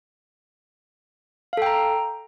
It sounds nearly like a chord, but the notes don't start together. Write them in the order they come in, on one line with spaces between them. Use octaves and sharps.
F5 A4 G5 A#5